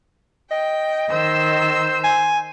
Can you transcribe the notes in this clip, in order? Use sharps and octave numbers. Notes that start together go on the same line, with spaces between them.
D#5 G5
D#3 C5 E6
G#5